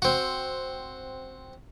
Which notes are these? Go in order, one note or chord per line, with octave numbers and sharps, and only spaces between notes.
C4 F#4